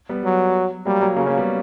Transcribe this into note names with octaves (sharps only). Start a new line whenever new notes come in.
G3 B3
F#3
F#3 G3 A#3
F#3 A#3
C#3 F#3 A#3
A#3 C#4
G3 B3